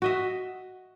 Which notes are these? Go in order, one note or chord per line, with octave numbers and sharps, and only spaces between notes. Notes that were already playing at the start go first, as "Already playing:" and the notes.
F#4 D#5 E5